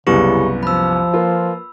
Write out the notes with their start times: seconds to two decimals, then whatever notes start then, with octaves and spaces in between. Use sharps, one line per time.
0.07 C2 F#2 C#3 B3 E4 G4 C#6
0.63 F3 B5 E6
1.14 A#3 F4 B4